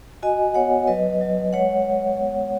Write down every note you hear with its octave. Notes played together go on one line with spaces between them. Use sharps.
F#4 D#5 G#5
B3 C#5 F#5
F#3 B4 D#5
F#3
G#3 C#5 F#5
G#3
B3